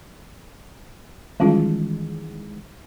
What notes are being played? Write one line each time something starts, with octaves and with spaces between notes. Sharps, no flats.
D#3 E3 G3 G#3 C#4 F4